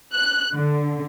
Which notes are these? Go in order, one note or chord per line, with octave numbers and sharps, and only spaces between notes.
F#6
D3